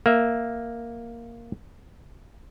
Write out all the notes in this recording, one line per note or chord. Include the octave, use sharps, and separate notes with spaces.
A#3 E5